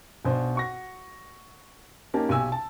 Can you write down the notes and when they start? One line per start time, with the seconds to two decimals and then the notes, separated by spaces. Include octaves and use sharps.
0.25 B1 B2 D4 C5
0.55 F#4 C#6 A#6
2.14 A#3 C#4 D#4 G4 A5
2.29 B1 G4 G#5 E6
2.52 A5